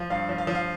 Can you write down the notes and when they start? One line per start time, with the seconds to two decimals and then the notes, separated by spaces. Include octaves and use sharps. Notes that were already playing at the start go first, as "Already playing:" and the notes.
Already playing: F3
0.10 G2 F5
0.29 F3
0.38 F5
0.47 F3
0.55 F5